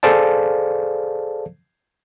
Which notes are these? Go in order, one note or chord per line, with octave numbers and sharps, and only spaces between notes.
G#4 A4 C5 D5 F5 A5